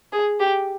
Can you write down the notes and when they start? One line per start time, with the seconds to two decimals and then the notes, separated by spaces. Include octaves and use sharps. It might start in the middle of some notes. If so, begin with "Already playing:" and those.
0.12 G#4
0.40 G4